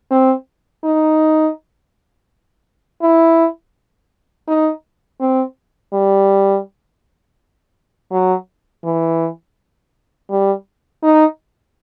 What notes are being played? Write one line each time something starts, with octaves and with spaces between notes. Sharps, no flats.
C4
D#4
E4
D#4
C4
G3
F#3
E3
G3
D#4